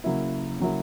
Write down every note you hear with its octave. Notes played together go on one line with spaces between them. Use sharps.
C#3 F#3 A#3 E4
C#3 F#3 A#3 E4